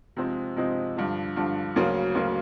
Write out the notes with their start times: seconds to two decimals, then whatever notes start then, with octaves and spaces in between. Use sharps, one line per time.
0.17 C3 F3 G#3 C4 D#4
0.56 C3 F3 G#3 C4 D#4
0.97 G2 D3 F3
1.36 G2 D3 F3
1.76 D2 C#3 F#3 A#3
2.15 D2 C#3 F#3 A#3